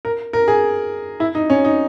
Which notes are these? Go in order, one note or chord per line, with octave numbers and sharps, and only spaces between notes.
A#4
A#4
G#4
E4
D#4
C#4
D#4